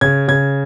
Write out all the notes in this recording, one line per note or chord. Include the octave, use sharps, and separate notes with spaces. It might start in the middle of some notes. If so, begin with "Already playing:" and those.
C#3 G#6
C#3 G#6